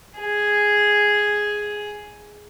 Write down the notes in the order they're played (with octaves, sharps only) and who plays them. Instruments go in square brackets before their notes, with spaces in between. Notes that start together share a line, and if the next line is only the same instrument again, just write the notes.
[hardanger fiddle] G#4